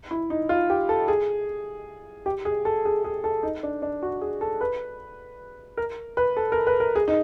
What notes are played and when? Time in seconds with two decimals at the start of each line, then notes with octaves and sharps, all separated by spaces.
0.11 E4
0.30 D#4
0.49 F4
0.70 G4
0.89 A4
1.08 G#4
2.26 G4
2.45 G#4
2.65 A4
2.85 G#4
3.04 G#4
3.24 A4
3.43 D#4
3.63 D4
3.82 D4
4.03 F#4
4.21 G#4
4.41 A4
4.61 B4
5.77 A#4
6.17 B4
6.37 A4
6.52 A#4
6.67 B4
6.80 A#4
6.95 G#4
7.08 D#4